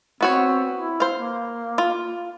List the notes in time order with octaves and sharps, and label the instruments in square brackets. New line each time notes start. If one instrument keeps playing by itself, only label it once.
[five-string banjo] B3 F#4 C#5 [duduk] C4
[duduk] E4
[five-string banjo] C5 F5
[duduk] A#3
[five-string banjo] F4